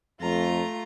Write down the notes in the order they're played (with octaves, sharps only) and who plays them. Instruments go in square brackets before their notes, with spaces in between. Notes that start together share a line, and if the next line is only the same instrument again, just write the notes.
[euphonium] F2 [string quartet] A3 F4 A#5